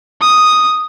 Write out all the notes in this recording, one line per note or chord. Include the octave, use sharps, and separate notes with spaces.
D#6